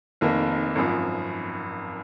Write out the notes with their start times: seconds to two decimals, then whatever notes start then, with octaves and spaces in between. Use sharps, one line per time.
0.21 F1 F2 D#3 A#3
0.75 G#1 F#2 F3